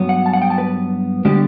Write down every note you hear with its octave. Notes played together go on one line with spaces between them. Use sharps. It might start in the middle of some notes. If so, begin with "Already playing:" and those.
Already playing: G2 F#3 B3
F#5
A5
F#5
G5
A5
B4
D3 G3 B3 D4 G4